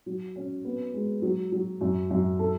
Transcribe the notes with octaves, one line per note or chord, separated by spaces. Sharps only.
F#3
C#4
B3
G#3
F#3
F#3
F#2
F#2
A4